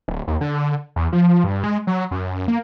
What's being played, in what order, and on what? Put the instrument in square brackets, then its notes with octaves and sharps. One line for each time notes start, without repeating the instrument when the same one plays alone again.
[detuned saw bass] D1
D#2
D3
E2
F3
G2
G#3
F#3
F#2
A#3